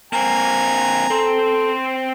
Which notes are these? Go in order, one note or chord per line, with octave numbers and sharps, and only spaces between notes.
A#3 C4 G#5 A#5
C4 A4 C5